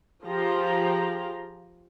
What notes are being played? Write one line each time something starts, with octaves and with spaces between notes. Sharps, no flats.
F3 F4 G4 G#4 A#5